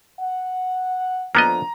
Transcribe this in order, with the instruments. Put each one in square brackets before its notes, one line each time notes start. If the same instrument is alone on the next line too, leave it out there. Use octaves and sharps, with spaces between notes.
[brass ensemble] F#5
[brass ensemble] D3 F3 D4 [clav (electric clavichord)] A#3 B3 D#5 [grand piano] A#5